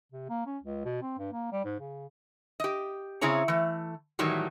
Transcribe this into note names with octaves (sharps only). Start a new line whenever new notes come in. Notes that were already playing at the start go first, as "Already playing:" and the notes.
C3
A#3
C#4
C#2
B2
C4
G2
A#3
G3
G#2
C#3
G4 D#5
C#3 C4 E4 G#4 C#5 A#5
E3 A3
A2 D#3 E3 F#3 G3